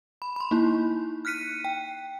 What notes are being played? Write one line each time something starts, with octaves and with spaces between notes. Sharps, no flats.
B5
B5 C6
A#3 D#4 E4
F6 F#6 B6 C#7 D#7
G5